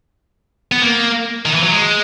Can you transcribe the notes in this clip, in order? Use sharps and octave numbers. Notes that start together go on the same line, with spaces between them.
B3
A#3
D#3
E3
F#3
G#3